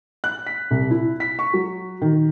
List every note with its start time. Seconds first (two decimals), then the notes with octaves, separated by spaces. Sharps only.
0.24 F#6
0.47 B6
0.71 C2
0.91 E4
1.20 B6
1.39 C#6
1.54 F#3
2.01 D#3